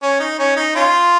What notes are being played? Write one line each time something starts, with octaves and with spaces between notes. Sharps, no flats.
C#4
D#4
C#4
D#4
C#4 F4